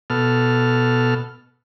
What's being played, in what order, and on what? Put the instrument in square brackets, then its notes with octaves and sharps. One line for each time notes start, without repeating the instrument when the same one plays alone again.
[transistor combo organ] B2 A4 F6